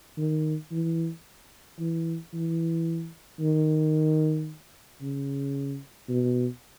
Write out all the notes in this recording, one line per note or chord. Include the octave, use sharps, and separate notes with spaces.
D#3
E3
E3
E3
D#3
C#3
B2